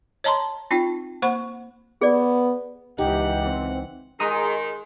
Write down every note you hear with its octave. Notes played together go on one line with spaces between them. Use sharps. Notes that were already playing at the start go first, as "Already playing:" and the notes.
C#5 D#5 A5 A#5 C6
C4 D#4 F4 G5
A#3 C5 F#5 B5 C#6
B3 G#4 D5
C#2 E3 D#4 G4 F#5
C4
D#3 G#3 G#4 A#5 D#6